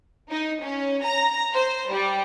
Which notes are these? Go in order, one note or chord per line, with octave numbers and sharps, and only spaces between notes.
D#4
C#4
A#5
C5
G3